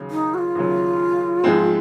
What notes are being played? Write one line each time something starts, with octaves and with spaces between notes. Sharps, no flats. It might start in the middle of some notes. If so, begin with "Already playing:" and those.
Already playing: D#2 C#3 F#3
D#4
F#4
F4
D#2 C#3 F#3
G#2 F3 G#3 C4